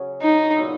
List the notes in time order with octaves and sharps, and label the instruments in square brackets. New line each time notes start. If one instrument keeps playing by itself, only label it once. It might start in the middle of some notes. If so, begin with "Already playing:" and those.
Already playing: [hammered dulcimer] C#3 F#3 C#4 G#4
[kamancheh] D#4
[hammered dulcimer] A#2 F#3 B3 E4